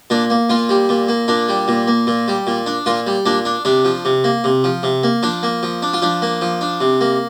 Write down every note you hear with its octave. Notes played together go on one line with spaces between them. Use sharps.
A#2 D4
A#3
A#2 F4
G3
A#2
A#3
A#2 D4
G3
A#2
A#3
A#2
G3
A#2
D4
A#2 F4
G3
A#2 D4
D4
C3 D4
F3
C3
A#3
C3
F3
C3
A#3
F3 D4
A#3
F3
D4
F4
F3 D4
A#3
F3
D4
C3
A#3